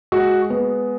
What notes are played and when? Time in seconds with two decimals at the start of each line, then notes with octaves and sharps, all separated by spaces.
0.12 G#3 F#4
0.50 B3